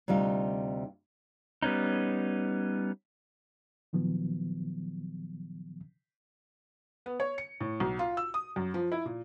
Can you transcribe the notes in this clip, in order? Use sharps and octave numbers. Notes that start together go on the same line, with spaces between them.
D2 C3 G3 D#4 F4
G3 B3 C#4 D#4
A#2 D#3 F3 F#3 B3
B3
C#5
C#7
A2
B1
F4
E6
D#6
F#2
F3
E4
A#2